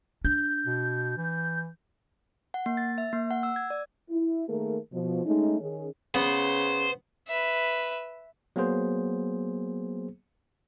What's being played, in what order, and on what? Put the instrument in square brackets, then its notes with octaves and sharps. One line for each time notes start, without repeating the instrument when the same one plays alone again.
[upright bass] D4 [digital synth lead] G6
[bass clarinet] B2
E3
[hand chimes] F#5
A#3
A6
E5
A#3
F#5
E6
G#6
D5
[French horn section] E4
D#3 A3 A#3 G#4 A#4
B2 F3
G#3 A3 C#4 D#4
D#3 C#4 G#4
[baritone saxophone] C#3 [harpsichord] B3 [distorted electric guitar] C5
[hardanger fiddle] B4 E5
[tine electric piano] F#3 A#3 B3 G#4 C5